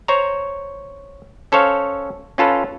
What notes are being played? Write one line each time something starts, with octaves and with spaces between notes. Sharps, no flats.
C5 C#5 A#5
C#4 A4 C5 C#5 F5
C#4 F4 A4 B4